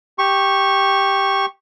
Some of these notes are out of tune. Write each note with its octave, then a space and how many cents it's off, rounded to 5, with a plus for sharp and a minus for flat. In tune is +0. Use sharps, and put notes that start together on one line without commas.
G4 +0 C#6 -10